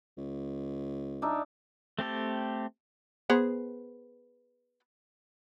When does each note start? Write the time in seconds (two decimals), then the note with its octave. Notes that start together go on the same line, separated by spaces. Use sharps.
0.17 C#2
1.22 D4 D#4 E5
1.99 A3 C4 G4 A4
3.30 B3 G#4 C5